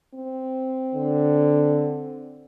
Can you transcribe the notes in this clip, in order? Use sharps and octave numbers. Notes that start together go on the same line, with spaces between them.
C4
D3